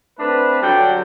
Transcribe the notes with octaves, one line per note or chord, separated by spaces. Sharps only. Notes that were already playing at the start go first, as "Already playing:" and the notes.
A3 C4 D4 B4
D3 F#3 G3 F#4 G5